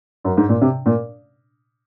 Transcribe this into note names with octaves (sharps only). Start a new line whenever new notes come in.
F#2
G#2
A#2
C3
A#2